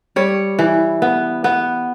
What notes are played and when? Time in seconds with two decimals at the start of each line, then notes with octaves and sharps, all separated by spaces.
0.16 G3 C#5
0.59 E3
1.02 B3
1.44 B3